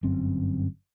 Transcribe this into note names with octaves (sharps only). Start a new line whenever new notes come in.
G1 F#2 C4